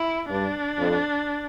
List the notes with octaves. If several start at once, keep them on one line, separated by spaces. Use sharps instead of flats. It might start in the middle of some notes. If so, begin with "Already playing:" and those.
Already playing: E4
G2 D4
F2